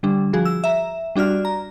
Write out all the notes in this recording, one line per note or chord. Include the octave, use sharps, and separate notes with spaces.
D3 G3 D4
F3 F#4 G#4
E6
E5 A#5
G3 D4 F#4 D5 F6
A#5